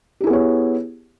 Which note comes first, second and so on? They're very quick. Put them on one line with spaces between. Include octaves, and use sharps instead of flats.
G4 E4 G#4 B3 C#5